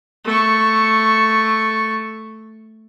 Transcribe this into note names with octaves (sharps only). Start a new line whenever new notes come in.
A3 C#6